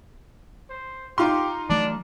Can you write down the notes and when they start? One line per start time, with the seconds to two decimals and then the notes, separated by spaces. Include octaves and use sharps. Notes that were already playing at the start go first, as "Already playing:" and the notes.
0.70 C5
1.18 D#4 F4 G4 C6
1.70 E3 F#3 A3 D4